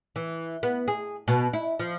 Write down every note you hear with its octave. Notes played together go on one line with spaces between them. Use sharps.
E3
B3
G#4
B2
E4
F3